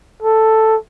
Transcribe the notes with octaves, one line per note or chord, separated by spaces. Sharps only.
A4